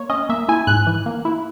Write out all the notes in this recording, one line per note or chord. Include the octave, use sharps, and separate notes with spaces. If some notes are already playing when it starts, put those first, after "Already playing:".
Already playing: A#3 C#5
C#4 D#5
A#3 E5
E4 G#5
G#2 F#6
E3
A#3
E4